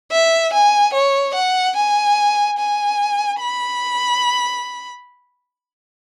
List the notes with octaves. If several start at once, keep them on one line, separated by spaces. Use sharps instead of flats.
E5
G#5
C#5
F#5
G#5
G#5
B5